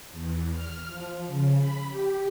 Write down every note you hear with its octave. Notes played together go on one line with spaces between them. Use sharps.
E2
F6
F3
C#3
B5
G4